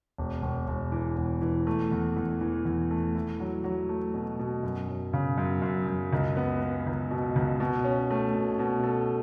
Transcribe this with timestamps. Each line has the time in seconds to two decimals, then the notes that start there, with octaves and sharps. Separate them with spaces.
0.18 E1
0.42 E1
0.68 E1
0.92 E3
1.18 E1
1.42 E3
1.67 A3
1.92 E2
2.17 E2
2.41 E3
2.65 E2
2.91 A3
3.15 E4
3.40 F#3
3.64 F#3
3.89 A3
4.14 B2
4.39 B2
4.63 F#2
4.89 F#3
5.13 C#3
5.38 F#2
5.62 F#2
5.87 F#2
6.13 C#2
6.37 B3
6.62 B3
6.87 C#2
7.11 B2
7.36 C#2
7.60 B2
7.85 C#4
8.10 A3
8.35 B2
8.59 B2
8.83 A4